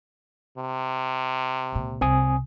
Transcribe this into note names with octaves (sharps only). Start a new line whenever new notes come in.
C3
C#2 A#2
C2 C4 G#5 D#6